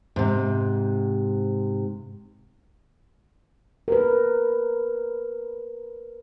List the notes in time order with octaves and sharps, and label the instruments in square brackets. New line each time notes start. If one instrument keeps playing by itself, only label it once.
[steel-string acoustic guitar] G#2 C3
[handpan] A#4 B4